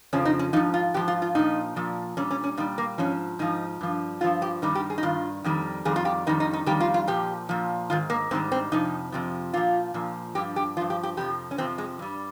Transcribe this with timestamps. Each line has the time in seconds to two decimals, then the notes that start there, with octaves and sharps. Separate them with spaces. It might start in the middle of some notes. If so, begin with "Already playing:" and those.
0.13 F2 C#3 F3 C#4
0.25 D#4
0.39 C#4
0.53 G#2 F3 D#4
0.74 F4
0.94 G#2 F3 G4
1.08 F4
1.22 F4
1.35 A#2 F3 D#4
1.76 A#2 F3
2.17 A#2 G3 C#4
2.31 C#4
2.44 C#4
2.57 A#2 G3 D#4
2.78 A#3
2.98 G#2 F3 C#4
3.39 G#2 F3 D#4
3.81 G2 F3
4.21 G2 F3 F4
4.42 G4
4.62 G2 D#3 G3 D#4
4.75 G4
4.90 G#4
4.98 D#4
5.03 G2 D#3 F4
5.44 F2 D#3 G3
5.85 F2 D#3 G3 G#4
5.96 F4
6.05 G4
6.27 F2 D#3 G3 D#4
6.40 D#4
6.53 D#4
6.66 F2 D#3 G3 G4
6.80 F4
6.94 F4
7.08 A#2 F3 G4
7.49 A#2 F3
7.90 G#2 D#3 F4
8.10 A#3
8.31 G#2 D#3 G3 C4
8.52 C4
8.72 F2 C3 F3 D#4
9.12 F2 C3 F3
9.54 A#2 F3 F4
9.94 A#2 F3
10.35 G2 F3 G4
10.56 G4
10.77 F3 F4
10.81 G2
10.90 G4
11.03 G4
11.17 F2 C3 F3 G4
11.51 C#4
11.58 F2 C3 F3 C4
11.78 G#3
11.99 G2 G3